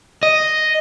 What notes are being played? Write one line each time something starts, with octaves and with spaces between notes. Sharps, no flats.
D#5